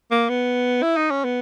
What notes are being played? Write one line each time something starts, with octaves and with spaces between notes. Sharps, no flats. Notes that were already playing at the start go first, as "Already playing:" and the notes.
A#3
B3
E4
D#4
C#4
B3